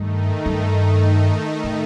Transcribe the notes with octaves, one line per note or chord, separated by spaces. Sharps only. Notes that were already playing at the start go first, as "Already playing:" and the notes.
Already playing: G2 D#3 A3 D#4
G2
A2